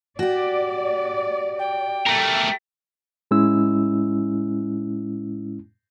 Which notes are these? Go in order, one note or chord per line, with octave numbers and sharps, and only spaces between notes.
F#4 G4 D5
G5
A3 A#4
A2 G#3 C#4 E4 E6